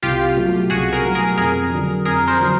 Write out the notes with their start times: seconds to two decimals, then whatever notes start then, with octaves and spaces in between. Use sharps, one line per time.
0.03 C2 F4 G4
0.36 B2 F#3 A3
0.70 C2 F#4 G#4
0.93 G#4 A#4
1.04 B2 F#3 A3
1.15 G#4 A#4
1.37 F2 G#4 A#4
1.72 D3 F#3
2.05 F2 G#4 A#4
2.28 A#4 C5
2.39 D3 F#3